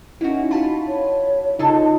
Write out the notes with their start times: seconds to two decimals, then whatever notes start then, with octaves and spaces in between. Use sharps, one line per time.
0.21 A#3 C#4 D#4 E4 F#4
0.51 F4 F#4 A5 B5
0.88 C#5
1.59 C#3 D#4 F4 G#4 A4 A5